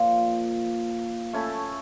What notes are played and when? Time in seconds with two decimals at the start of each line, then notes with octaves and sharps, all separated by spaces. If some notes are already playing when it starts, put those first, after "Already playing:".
Already playing: A#2 F3 A#3
1.33 A3 C#4 E4 A4